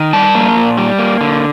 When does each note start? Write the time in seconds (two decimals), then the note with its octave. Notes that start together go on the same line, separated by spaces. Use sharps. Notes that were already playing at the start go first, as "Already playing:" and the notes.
Already playing: D#3
0.13 G3 A5
0.35 A#3
0.56 A#2
0.77 G3
0.98 A#3
1.21 D3